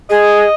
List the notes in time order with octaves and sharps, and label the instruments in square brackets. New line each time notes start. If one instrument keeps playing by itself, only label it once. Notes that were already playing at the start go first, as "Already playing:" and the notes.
[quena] G#4 [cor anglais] D#5